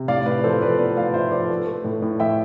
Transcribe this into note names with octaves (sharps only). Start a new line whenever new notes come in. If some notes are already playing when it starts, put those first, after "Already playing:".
Already playing: C3
A2 D5 F5
A2 B4 D5
F3 A4 C5
A2 B4 D5
B3 B4 D5
A2 D5 F5
F3 C5 E5
F3 B4 D5
A3
A3
A2
A2
A2 E5 G5